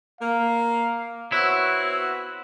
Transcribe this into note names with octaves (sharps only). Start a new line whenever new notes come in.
A#3 F5
B3 C4 E4 F#4 C#5